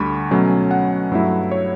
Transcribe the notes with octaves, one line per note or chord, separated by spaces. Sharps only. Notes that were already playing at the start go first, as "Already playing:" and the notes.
Already playing: D2 D3 G3 B5 C#6
B2 F#3 A3 C#4
F#5
G2 F#3 A3 E4
C#5